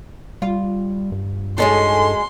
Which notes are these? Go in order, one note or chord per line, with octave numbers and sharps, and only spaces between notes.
G3 F4
G2
G#3 C#4 D#4 F#4 A4 D#5 C6